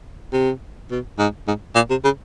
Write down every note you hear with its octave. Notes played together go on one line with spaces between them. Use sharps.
C3
B2
G#2
G#2
A#2
C3
C#3